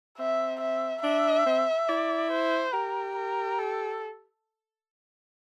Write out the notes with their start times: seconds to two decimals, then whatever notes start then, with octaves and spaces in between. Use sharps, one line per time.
0.18 C4 E5
0.61 E5
1.03 D4 E5
1.46 C4
1.89 E4 D5
2.31 C5
2.73 G4 A#4
3.16 A#4
3.58 A4